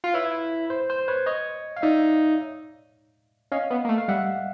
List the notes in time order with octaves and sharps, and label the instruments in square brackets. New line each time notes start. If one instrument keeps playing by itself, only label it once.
[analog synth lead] F4
[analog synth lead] E4 [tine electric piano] B4 C#5
[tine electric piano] C5
C5
B4 C#5
C#5 D#5
F5
[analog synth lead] D#4 [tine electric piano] D5 E5
[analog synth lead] C#4 [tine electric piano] D#5 F5
[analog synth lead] B3
A#3
A3
[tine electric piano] F5
[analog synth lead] G3 [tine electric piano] E5 F#5